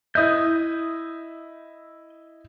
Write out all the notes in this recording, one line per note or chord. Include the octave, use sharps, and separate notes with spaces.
E4 D#5 E5 D#6 G6